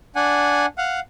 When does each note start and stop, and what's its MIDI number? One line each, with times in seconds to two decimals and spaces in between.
0.16 0.66 62
0.16 0.66 78
0.16 0.66 80
0.78 1.00 77
0.78 1.00 78